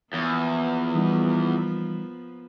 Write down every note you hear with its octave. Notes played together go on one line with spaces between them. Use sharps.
E2 F3 A#3 B3 G#6
E3 G3 D#4